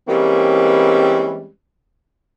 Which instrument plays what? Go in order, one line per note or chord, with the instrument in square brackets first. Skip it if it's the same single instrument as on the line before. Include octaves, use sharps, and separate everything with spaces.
[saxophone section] E3 G3 G#3 A#3 C4 C#4